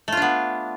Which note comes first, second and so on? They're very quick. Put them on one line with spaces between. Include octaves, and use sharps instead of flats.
A3 F4 D4 B3